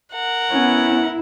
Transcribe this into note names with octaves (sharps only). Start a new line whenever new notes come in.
A#4 F#5
B3 C#4 E4